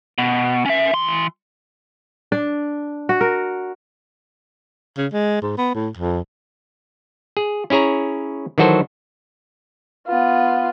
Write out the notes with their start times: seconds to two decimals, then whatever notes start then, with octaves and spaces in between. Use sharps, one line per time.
0.18 B2
0.66 C#4 E5
0.93 E3 C6
2.32 D4
3.09 F#4
3.21 A#4
4.97 C#3
5.12 G#3
5.42 G#2
5.57 B3
5.75 A2
5.97 F2
7.37 G#4
7.70 C#4 E4 G#4 C#5 A#5
8.58 D#3 E3 F#3 F#4 A4 C5
10.07 B3 F4